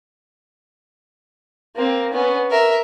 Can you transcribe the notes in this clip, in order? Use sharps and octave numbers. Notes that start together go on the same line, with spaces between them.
A#3 C4
B3 C#4
A#4 E5